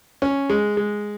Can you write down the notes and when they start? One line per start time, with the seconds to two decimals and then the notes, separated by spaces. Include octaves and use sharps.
0.22 C#4
0.50 G#3
0.77 G#3